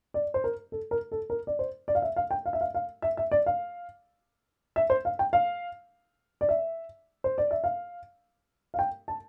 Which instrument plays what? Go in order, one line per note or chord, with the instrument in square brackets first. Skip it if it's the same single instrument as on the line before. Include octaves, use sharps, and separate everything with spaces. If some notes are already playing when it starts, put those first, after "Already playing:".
[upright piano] D5
C5
A#4
A4
A#4
A4
A#4
D5
C5
D5
F5
E5
F5
G5
F5
E5
F5
F5
E5
E5
D5
F5
E5
C5
F5
G5
F5
D5
E5
C5
D5
E5
F5
F5
G5
A5